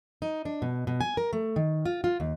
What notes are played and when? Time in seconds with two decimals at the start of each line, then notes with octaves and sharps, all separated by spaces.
0.22 D#4
0.45 D4
0.62 B2
0.87 B2
1.01 G#5
1.17 A#4
1.33 A3
1.56 D#3
1.86 F4
2.04 F4
2.20 D#2